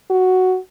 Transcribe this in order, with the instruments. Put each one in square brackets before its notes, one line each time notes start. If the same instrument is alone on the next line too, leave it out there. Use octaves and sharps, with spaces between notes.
[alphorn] F#4